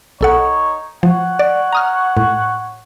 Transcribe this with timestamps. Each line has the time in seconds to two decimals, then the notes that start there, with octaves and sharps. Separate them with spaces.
0.21 B1 D#4 A4 C#5 F#5
1.03 F3 C#5 F#5
1.39 D5
1.73 A#5 D#6 F6
2.17 A2